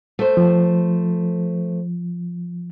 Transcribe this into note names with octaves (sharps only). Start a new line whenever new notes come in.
A3 C5
F3